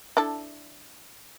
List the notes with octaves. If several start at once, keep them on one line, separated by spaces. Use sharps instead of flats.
D4 E4 A4